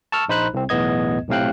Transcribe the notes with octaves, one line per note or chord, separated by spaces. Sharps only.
A5 C#6 E6 F6
A#1 D#4 C5 B5 F#6
C2 C4
B1 E2 A2 B3 D#5 G#6
B1 A2 C3 F5 G5 F#6